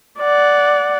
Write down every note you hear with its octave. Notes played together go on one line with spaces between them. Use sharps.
D5 F#5